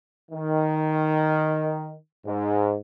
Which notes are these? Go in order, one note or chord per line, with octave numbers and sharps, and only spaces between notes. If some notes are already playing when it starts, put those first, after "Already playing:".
D#3
G#2